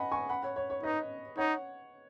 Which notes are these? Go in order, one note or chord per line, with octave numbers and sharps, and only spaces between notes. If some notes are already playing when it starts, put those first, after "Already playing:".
Already playing: D#5 F#5 G#5 B5
G#5 C#6
F#5 B5
C#5 F#5
C#5
C#5
D#4 B4 D#5
D#4 C#5 F#5